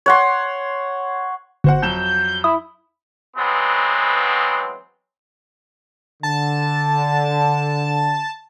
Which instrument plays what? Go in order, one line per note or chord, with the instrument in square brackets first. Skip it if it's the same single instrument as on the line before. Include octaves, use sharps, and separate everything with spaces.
[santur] C#5 F#5 C6
[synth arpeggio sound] G1 [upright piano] F#4 C5 F#5
[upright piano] F2 F#3 E7 [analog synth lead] G6
[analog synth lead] G6
[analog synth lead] E4 [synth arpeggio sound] D#6
[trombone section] E3 F#3 G#3 B3 C4
[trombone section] D3 [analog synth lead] A5